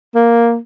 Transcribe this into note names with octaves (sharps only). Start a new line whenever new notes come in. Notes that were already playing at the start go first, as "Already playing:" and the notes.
A#3